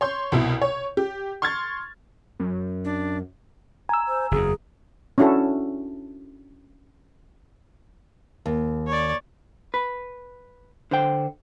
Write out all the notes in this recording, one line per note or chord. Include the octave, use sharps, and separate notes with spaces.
C#5 C6 G6
C2 B2 E4
C#5
G4
C6 C#6 F6 G#6 A6
F#2
D4
G#5 A#5 E6
C5
F#1 E2 G#4
C#4 D4 E4 F#4 A4
D#2
C#5 D5
B4
D3 C5 G5